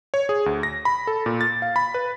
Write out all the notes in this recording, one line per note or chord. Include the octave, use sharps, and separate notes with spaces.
C#5
G#4
D2
A#6
B5
A4
A#2
A6
F5
B5
B4